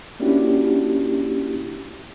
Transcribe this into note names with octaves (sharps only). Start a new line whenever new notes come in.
A#3 C#4 D4 E4 F#4 G4